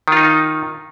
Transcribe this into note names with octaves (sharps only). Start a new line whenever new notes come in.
D#3 D#4 F4